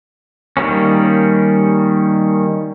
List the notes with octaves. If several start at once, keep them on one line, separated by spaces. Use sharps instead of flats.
D#3 G3 A#3 C#4